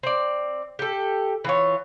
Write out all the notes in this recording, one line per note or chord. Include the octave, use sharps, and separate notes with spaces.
C4 D5
G4 A4
E3 F4 C#5